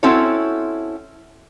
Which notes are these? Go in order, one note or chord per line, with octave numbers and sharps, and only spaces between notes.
C4 C#4 E4 F#4 A4 C#5